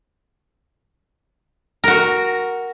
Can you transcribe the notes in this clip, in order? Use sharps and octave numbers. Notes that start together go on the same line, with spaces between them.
F#4 A#4